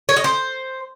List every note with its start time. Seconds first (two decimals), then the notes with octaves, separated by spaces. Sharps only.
0.09 C#5
0.16 D#5
0.24 C5